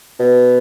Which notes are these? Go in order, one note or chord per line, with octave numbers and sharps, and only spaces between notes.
B2